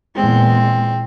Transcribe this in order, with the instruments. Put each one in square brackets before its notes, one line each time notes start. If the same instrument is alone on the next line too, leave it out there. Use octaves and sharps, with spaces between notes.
[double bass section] E2 A#2 G#3 [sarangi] C4